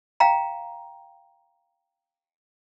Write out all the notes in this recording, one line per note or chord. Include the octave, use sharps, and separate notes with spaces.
F5 G5 A#5